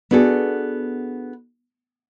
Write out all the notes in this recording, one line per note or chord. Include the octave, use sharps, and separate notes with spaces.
B3 D4 F#4 G#4 A4